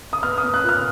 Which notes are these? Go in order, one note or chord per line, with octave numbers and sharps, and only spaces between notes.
D#6
B3 F6
D#6
B3
F#6
A#2
F6